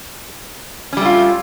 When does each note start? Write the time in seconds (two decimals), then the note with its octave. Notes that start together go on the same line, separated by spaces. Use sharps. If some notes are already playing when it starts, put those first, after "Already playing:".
0.93 C#4
0.97 G3
1.01 A3
1.05 F4